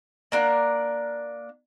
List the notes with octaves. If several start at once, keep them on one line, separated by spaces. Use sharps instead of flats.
A#3 D4 A#4 F#5